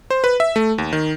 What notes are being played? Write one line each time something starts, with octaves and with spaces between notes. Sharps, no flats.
C5
B4
E5
A3
D#2
D#3